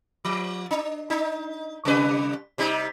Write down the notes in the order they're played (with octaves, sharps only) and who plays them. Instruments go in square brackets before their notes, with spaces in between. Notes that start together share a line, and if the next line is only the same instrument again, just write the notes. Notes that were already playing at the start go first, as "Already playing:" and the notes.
[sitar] F3
D4
D4 D#4
C3 G3 B4
C3 G3 D#4